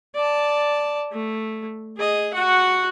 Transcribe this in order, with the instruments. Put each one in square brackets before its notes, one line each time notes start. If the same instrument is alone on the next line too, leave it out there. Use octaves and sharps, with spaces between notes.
[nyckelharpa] D5 A5
A3
G#4 D#5
F#4 F#5